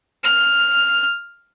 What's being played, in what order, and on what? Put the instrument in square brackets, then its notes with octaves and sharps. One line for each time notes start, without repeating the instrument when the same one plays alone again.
[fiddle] F6